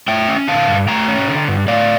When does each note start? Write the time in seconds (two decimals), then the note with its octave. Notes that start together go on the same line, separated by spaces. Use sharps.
0.08 A3 E5 G5
0.29 C#4
0.48 D3 F5 A5
0.68 G2
0.88 A3 G5 A#5
1.08 C#4
1.28 D3
1.48 G2
1.68 A3 D5 F5